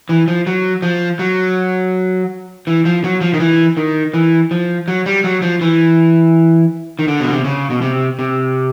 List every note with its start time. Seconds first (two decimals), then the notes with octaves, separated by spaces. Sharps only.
0.09 E3
0.28 F3
0.47 F#3
0.82 F3
1.19 F#3
2.67 E3
2.85 F3
3.04 F#3
3.21 F3
3.34 D#3
3.40 E3
3.77 D#3
4.14 E3
4.51 F3
4.88 F#3
5.06 G3
5.24 F#3
5.42 F3
5.61 E3
6.99 D#3
7.08 D3
7.20 B2
7.32 C3
7.44 C#3
7.70 B2
7.81 C3
8.19 C3